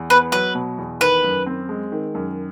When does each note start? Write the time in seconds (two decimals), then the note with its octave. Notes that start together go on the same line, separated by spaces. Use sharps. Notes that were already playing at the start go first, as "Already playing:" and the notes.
Already playing: E2
0.10 B3 B4
0.32 F#3 B4
0.55 B2
0.78 E2
1.00 D#3 B4
1.24 F#2
1.46 C4
1.69 G#3
1.92 D#3
2.15 F#2